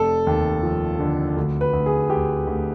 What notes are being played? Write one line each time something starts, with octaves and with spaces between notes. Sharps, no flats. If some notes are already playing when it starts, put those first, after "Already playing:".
Already playing: F1 A4
D#2
F3
D3
D2
B4
D2
G#4
D2 G4
D2